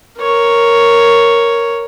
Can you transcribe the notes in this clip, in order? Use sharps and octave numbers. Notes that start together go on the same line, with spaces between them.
A#4 C#5